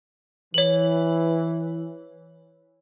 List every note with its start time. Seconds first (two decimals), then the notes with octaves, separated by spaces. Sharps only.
0.54 E3 C#5 F#7